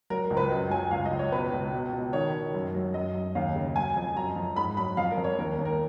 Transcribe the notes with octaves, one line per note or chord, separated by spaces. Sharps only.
F#3 A#4
A#4
C#2
B4
F#2 D#5
F#3 G#5
C#2 F5
D#5
C#2
C#5
B2 B4
C#2
B2
B2
D#3 C#5
D#3
F#2
F#3
F#2 D#5
F#2
D#2 F5
C#3
F#3 G#5
F2
F#2 A#5
F3
G#2 B5
F#3 B5
F2 F5
A#4
F2
C#5
D#2 A#4
A#4
D#2
A#4